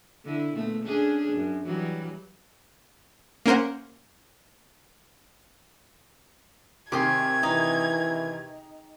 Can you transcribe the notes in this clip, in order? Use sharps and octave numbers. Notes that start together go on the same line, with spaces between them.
D3 E4
A#2 A3 B3
C#4 D4 G#4
F#2
E3 F#3 G3
A#3 C#4 A#4 C5 F#5
C3 D#3 G4 G#4 C6 G#6
E3 D#4